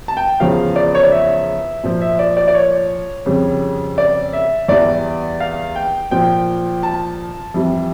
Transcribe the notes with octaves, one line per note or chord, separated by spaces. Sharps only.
A5
G5
E2 C#3 F3 F5
D5
C#5
D5
E5
A#2 F3
E5
D5
D5
D5
C#5
F2 C#3 G3
D5
E5
E2 E3 G3 D5
F5
G5
A#2 F3 G5
A5
F2 E3 G3